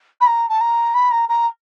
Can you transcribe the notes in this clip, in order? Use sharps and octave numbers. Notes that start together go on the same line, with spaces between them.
B5
A#5
A5
A#5
B5
A#5
A#5